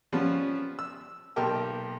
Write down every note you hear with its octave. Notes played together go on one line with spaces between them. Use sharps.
F3 G3 B3 C#4
E6
B1 A#3 G4 A#4 G5 A5